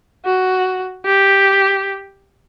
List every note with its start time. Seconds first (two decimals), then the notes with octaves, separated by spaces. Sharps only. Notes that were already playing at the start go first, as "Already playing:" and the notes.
0.25 F#4
1.05 G4